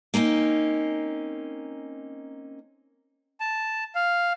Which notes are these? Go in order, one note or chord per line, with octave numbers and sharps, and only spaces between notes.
A#3 C4 C#4 D#4
A5
F5